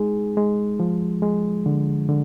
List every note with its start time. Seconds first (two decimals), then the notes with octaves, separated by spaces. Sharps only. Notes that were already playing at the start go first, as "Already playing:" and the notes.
Already playing: G#3 D#4 G#4
0.37 G#3
0.80 F3
1.22 G#3
1.66 D3
2.09 D3